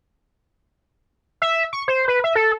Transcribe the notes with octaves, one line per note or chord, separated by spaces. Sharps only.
E5
C#6
C5
B4
E5
A4